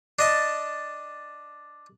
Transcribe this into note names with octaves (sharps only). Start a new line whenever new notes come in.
D4 D#5 A5